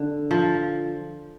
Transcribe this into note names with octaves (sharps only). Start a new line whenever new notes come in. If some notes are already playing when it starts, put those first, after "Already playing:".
Already playing: D3
F3